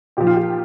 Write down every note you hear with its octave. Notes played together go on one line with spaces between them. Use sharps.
A#2 F3 G4
F4
G4